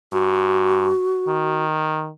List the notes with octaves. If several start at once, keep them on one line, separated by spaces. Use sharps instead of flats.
G2 F#4
D#3